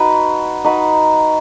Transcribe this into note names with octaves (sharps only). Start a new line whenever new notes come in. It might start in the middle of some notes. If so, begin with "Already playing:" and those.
Already playing: D#4 F#4 B4
D#4 F#4 B4